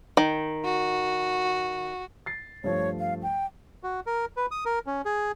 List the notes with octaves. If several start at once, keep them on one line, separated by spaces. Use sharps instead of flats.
D#3
F#4
A6 C7
G2 F3 A3 C#5
F5
G5
F#4
A#4
B4
D#6
A#4
C#4
G#4